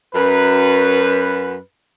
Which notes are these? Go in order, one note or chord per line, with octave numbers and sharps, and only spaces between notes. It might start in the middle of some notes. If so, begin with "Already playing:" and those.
F#2 B4